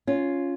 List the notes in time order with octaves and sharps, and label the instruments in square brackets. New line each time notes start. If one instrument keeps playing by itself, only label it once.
[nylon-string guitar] C#4 F4